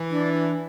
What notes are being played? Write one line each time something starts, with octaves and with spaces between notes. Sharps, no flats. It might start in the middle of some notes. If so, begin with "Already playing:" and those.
Already playing: E3
D4
D4